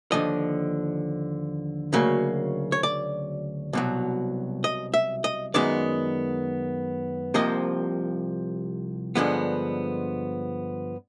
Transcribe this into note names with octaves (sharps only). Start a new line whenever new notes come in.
D#2 D3 F3 D#5
D2 C#3 F#3 A#3
C#5
D5
C2 B2 F#3
D#5
E5
D#5
F#2 D#3 G#3 B3 D5
C2 C3 F3 A#3 D#5
G2 D3 F3 G#3 B3